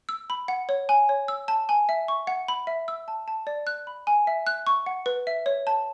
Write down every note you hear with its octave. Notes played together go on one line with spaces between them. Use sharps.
E6
B5
F#5
C#5
G#5
C#5
E6
A5
G#5
E5
C#6
F#5
B5
E5
E6
A5
A5
D5
F#6
B5
G#5
E5
F#6
C#6
F#5
B4
E5
C#5
A5